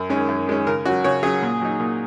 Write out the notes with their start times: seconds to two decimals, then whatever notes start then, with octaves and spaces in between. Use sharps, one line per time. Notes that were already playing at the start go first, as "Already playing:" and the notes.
Already playing: F#2
0.09 D#3 G#3 C#4
0.29 F#2
0.48 D#3 G#3 C#4
0.67 C#3 A#4
0.85 F#3 C#4 F#4
1.04 C#3 C#5
1.23 F#3 C#4 G#4
1.42 A#2
1.61 F#3 D#4
1.80 A#2